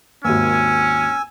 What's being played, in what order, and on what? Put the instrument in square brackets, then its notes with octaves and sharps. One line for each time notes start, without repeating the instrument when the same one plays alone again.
[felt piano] G#1 D#2 [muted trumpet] C#4 [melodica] G#5 E6